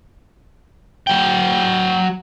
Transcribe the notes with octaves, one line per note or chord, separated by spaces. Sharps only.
F#3 G5